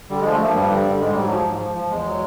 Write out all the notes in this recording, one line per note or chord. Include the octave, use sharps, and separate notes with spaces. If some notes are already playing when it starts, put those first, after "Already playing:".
D3 G3
F3 G#3
A3
F3 A#3
G2 G3
D3
D3
G#2 G#3
G#2 G3
F#3
F3
G#2
F3
F3
E2 G#3
F#3